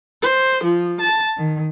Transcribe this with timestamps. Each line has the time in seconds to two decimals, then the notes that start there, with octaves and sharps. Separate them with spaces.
0.22 C5
0.63 F3
1.01 A5
1.37 D#3